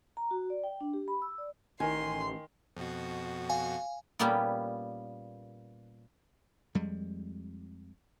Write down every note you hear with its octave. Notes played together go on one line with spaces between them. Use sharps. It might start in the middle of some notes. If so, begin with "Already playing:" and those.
A#5
F#4
D5
G5
D4
G4
B5
E6
D5
A1 D#3 G#5 C6
F2 B2 F#4
F5 G#5
A#2 G3 A#3 B3 C#4 G4
F2 G3 G#3